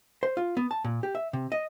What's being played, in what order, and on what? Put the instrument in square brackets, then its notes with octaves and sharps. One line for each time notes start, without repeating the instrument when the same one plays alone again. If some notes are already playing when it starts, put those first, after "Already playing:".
[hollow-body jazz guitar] C5
F4
B3
A5
A#2
G4
E5
C3
D#5